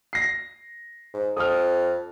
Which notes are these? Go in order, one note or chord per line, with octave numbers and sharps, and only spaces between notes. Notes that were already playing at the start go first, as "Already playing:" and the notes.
A#6 C7
G#2
F2 D#6 F6